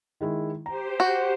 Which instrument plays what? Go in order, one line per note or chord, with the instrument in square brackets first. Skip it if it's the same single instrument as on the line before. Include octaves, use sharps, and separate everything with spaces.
[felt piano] D#3 G#3 E4
[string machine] G4 C5 [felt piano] A#5
[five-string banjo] F#4